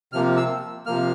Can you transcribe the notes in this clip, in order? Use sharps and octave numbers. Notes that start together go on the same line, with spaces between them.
C3 F3 A#3 F6
E6
C3 F3 A#3 F6